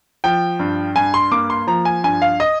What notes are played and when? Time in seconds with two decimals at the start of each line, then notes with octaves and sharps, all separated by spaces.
0.24 F3 G5
0.59 G2
0.96 G2 G#5
1.14 C6
1.32 A#3 D6
1.50 C6
1.67 F3 A#5
1.85 G#5
2.04 G2 G#5
2.22 F5
2.40 D#5